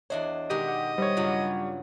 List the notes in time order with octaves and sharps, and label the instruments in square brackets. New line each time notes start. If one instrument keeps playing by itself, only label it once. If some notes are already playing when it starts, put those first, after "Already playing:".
[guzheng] E2 D4 C5 [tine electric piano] C#5 D#5 E5
[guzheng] B2 D#3 G#3 [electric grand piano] G4 [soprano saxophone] D#5
[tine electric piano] F#5
[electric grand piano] G3 C#5 [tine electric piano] C5
[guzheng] G2 C#3 F#3 [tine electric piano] F4